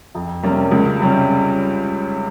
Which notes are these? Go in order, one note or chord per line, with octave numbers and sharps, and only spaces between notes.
F2
C3 G3 A#3 C#4
C#2
C3 G3 C#4